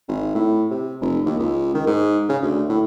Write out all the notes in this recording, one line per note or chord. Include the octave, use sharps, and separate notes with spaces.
G#1
A2
C3
F1
D#2
C#2
D#3
G#2
C#3
D2
A2